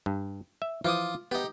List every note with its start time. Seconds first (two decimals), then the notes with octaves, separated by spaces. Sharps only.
0.06 G2
0.62 E5
0.85 E3 F3 F4 D6 D#6
1.31 B3 D#4 G4